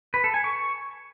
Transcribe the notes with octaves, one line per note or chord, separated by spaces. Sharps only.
B4
A4
G#5
C#6